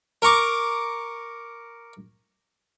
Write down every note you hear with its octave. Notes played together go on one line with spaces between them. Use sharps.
A#4 A#5 C#6 D6